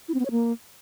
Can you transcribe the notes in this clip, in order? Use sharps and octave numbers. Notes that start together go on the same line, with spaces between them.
E4
C4
B3
C#5
A#3